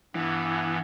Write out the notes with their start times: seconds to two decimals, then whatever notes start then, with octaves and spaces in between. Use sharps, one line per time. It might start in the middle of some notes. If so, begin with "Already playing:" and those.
0.15 G2 E3 B3